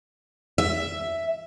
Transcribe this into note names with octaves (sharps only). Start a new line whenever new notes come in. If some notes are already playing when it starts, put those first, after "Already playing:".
E5